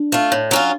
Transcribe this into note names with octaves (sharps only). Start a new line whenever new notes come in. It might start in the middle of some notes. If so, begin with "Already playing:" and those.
Already playing: D4
A3 F4
A2
F#3 C#4 F4